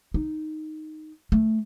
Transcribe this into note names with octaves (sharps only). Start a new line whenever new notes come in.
D#4
A3